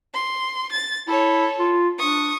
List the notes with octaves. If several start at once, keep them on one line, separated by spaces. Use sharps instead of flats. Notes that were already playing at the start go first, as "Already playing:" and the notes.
C6
A6
E4 A4 C#5
F4
D4 C#6 D#6